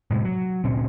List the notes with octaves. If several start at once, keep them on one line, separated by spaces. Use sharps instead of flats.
A2 C3 G#3
F#3
D2 A#2 C4 C#4